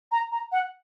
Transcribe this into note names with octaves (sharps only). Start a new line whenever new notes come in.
A#5
A#5
F#5